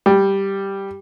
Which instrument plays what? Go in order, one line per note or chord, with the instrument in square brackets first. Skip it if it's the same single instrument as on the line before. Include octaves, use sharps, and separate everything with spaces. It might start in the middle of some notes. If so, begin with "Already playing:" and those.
[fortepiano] G3